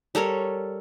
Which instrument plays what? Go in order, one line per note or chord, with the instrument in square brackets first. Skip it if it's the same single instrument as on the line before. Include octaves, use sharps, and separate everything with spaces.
[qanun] G3 A4 A#4 C#5